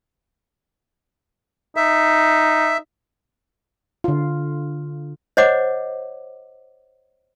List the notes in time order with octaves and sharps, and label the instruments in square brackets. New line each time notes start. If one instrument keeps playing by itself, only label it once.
[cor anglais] D#4 [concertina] E5
[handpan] D3 F4
[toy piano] C5 C#5 D#5 F#5 D6